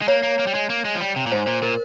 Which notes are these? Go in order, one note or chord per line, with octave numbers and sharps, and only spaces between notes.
G#3
A#3 C#5
A#3
A#3
G3
G#3
A#3
G#3
F3
G3
C3
A#2
G#2 C5
A#2 C5
A#2 A#4